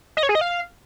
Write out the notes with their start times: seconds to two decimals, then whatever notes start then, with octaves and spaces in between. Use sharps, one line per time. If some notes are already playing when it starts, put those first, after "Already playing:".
0.17 D#5
0.23 C#5
0.29 G#4
0.35 D#5
0.41 F5